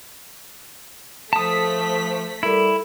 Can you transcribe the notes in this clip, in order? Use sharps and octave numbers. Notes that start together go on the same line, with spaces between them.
F3 A3 A5 D#6 B6
G3 E4 A4 A#4